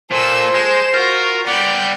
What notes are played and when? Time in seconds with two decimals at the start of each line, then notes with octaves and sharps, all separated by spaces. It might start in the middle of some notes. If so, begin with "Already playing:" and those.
0.11 A#2 A4 C5 E6
0.54 G#3 E7
0.94 F4 F#4 A#4
1.47 G3 B3 D5 F6 G6